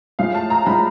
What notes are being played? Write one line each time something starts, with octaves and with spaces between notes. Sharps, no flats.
A2 F3 G#3 F5
A5
A#5
A2 F3 G#3 B5